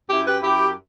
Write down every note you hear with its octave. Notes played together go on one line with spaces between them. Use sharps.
F#2 E4 G4
G4 B4
F#2 E4 G4